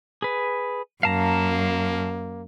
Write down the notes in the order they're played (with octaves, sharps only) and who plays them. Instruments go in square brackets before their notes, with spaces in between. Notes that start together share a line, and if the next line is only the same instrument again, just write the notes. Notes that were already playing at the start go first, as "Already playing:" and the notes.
[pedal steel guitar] G#4 B4
[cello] F#2 [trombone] A#3 [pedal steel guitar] F5 A5 A#5